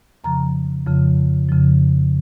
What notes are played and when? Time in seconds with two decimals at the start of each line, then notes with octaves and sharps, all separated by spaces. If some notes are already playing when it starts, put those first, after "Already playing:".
0.24 F2 C#3 F3 A#5
0.86 F2 C#3 F3
1.49 F2 C#3 F3